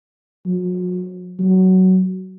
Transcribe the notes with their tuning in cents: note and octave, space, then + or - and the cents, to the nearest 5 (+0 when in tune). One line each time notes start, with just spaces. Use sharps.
F#3 -40
F#3 +15